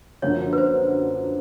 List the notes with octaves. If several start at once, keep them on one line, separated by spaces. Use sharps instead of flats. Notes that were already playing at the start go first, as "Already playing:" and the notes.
F#2 D3 F3 A#3 C#5
B4
C5